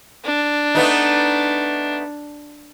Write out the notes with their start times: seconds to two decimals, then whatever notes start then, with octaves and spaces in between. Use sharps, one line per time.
0.25 D4
0.75 A3 B3 D#4